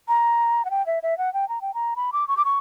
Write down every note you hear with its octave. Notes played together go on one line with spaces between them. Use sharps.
A#5
F#5
G5
E5
E5
F#5
G5
A#5
G5
A#5
B5
D6
C#6
D6
C#6